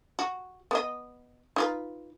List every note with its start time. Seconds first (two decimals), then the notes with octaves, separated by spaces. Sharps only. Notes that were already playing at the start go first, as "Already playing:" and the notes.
0.19 F#4
0.71 B3 D#5
1.56 D#4 F4 B4